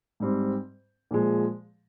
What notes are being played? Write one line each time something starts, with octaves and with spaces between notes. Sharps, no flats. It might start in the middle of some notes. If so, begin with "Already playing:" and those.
G#2 G3 C4
A#2 F3 G#3